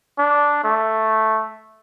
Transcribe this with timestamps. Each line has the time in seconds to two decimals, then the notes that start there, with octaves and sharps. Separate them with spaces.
0.18 D4
0.64 A3